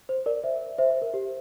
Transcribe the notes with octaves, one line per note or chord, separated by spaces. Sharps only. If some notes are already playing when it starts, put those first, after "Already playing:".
C5
A#4 D5
C5 E5
C5 E5
C5
A#4
G4